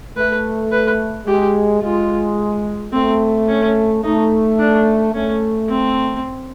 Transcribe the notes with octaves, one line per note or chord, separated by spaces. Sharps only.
A3 B4
B4
G#3 G4
G#3 F4
A3 C4
C#4
A3 D#4
D4
A3 C#4
C4